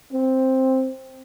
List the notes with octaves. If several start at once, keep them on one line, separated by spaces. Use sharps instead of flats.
C4